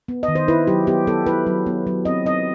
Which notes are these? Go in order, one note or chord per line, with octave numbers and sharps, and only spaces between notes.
B3
D#5
D#3
C5
E4 B4
F#3 G4
B3 G4
B3 A4
E4 B4
F#3
B3
F#3
C4 D#5
C4 D#5